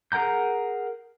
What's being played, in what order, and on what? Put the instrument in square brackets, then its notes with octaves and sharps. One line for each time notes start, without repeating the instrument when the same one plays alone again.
[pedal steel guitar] G#4 A#4 F#5 A#5 G6